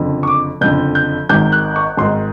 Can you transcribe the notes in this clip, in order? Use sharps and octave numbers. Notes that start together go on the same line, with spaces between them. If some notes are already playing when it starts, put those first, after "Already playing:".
Already playing: F#1 F2 D3
C#6
D6
F#1 F2 D3 G6
G6
G#1 G#2 D#3 G6
F#6
C#6
G#1 G#2 D#3 C6